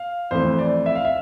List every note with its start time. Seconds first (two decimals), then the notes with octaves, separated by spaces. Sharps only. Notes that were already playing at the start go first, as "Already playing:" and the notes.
Already playing: F5
0.31 F2 E3 A3 C5
0.59 D5
0.86 E5
0.95 F5
1.05 E5